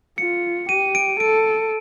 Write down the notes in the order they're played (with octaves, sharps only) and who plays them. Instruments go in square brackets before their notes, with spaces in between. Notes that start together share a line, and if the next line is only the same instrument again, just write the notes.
[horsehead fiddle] F4 [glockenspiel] C#7
[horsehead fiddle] G4 [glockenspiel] D#7
[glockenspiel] D7
[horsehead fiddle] A4 [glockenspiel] D7